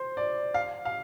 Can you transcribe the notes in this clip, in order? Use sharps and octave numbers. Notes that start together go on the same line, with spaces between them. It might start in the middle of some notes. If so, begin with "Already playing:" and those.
Already playing: C5
D5
F5
F5